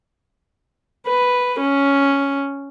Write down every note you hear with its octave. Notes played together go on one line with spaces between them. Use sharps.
B4
C#4